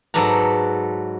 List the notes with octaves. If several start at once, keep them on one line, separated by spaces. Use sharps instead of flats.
G#2 F#3 A4 B4 D5 A#5